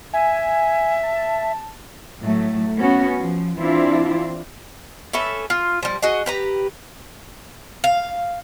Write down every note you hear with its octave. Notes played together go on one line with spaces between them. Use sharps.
E5 G#5
A5
A2 F#3 A3
B3 C#4 F#4
F3
E3 C4 D4 E4 F4
C#4 A4 B4 E5
F4
F3 G3
F#4 G#4 D#5
G4 B4 A#5
F5